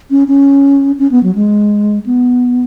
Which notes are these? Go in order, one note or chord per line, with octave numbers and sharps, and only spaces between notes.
C#4
C#4
C#4
B3
F#3
G#3
B3